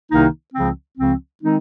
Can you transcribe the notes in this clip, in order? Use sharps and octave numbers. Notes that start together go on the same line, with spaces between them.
C2 C3 D#3 A#3 D#4
C#2 C#3 F3 C4
C#2 C#3 F3 C4
D#3 G#3 C4 D#4